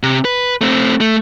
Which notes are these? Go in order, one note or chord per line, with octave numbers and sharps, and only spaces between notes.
C3
B4
A3 C4
A3